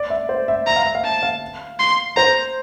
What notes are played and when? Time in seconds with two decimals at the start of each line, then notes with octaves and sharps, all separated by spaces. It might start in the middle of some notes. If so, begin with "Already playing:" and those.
Already playing: D5
0.10 E5
0.29 C5
0.48 E5
0.67 E5 A#5
0.76 F5
0.86 E5
0.95 F5
1.04 A5
1.23 F5
1.79 C6
2.16 C5 A#5